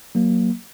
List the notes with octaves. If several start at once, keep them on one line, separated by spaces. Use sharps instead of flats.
F#3 A#3